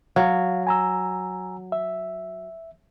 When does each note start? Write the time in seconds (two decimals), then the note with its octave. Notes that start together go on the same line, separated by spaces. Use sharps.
0.16 F#3 F5
0.67 G#5 A#5 E6
1.72 E5